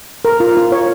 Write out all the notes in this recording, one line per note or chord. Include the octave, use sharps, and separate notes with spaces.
A#4
F4
F4
C#5